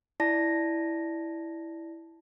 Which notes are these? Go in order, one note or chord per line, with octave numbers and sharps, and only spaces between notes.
E4 D5 A5 A#6